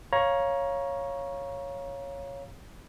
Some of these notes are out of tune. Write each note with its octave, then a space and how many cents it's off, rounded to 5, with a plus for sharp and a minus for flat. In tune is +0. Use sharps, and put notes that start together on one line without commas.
C#5 +0 F5 +0 A#5 +20